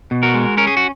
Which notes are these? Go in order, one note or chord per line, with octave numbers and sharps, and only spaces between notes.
B2
F#4 A#4
G#3
C#4 A#4
G#4
F#4